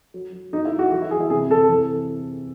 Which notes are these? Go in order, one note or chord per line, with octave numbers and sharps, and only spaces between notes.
F#3
F#3
F#3 D#4
E4
F#3
F#4
E3 F#4
E4
E3 G#4
E4
C3 G#4
C3 A4
E3